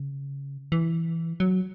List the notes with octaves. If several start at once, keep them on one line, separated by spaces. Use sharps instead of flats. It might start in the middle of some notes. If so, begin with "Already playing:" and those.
Already playing: C#3
E3
F#3